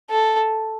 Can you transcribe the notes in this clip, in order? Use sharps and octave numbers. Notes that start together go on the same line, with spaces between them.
A4